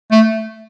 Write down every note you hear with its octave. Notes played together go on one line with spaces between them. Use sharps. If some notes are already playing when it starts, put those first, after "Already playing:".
A3